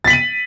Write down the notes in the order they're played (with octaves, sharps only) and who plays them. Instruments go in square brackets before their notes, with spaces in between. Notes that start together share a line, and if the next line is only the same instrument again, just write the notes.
[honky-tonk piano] A6
B6
F#7
D#7